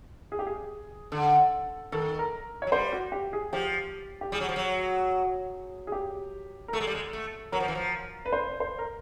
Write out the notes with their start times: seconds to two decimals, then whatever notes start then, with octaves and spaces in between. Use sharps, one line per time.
0.32 G#4
0.39 G4
0.47 G#4
1.12 D3 A4
1.92 D#3 A4
2.19 A#4
2.62 C#5
2.67 F#3
2.72 G3 C5
2.93 F#4
3.12 G4
3.33 G#4
3.53 F3 G4
4.21 G4
4.32 G3 G#4
4.40 F#3
4.49 F3
4.56 F#3
5.87 G#4
5.92 G4
6.68 A#4
6.73 A3 A4
6.81 G#3
6.87 G3
6.95 G#3
7.13 A3
7.52 F#3 A#4
7.60 F3
7.68 E3
7.75 F3
8.26 B4
8.33 C5
8.60 C5
8.78 A#4